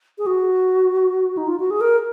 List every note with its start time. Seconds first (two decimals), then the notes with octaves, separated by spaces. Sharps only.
0.18 G#4
0.26 F#4
1.37 D#4
1.48 F4
1.60 F#4
1.71 G#4
1.81 A#4